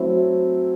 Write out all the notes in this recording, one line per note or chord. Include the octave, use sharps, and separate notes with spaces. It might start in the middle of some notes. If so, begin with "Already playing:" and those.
Already playing: F#3 A3 C4 E4